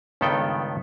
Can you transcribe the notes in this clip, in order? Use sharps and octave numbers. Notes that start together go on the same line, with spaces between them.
C#2 G2 D#3 B3 A4 G5